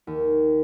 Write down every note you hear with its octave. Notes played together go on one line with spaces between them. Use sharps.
D#2